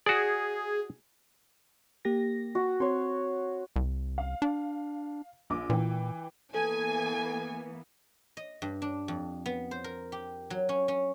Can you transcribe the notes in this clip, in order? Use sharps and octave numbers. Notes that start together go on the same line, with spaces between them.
F#4 G#4 D5
A#3 G4 A#6
F#4
C4 C#5 C6
C2
F5
D4
A#1 D6
A#2 E3 G5
E3 A#3 B3 A4 G#5
D#5
G2
D4
F2
B3
C5
A#4
G4
F#3
C#4
C#4